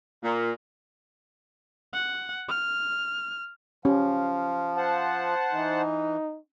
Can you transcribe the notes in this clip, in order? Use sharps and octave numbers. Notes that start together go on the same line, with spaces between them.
A#2
F#5
F6
F3 C#4 G4 F5
C5 F#5 A5
E3 D#4